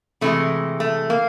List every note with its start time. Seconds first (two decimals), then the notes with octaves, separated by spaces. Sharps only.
0.21 C3 E3 G#3 A3
0.80 A3
1.10 A#3